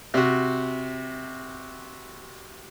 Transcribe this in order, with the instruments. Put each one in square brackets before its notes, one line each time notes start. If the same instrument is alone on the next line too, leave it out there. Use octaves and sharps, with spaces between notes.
[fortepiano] C3 F#4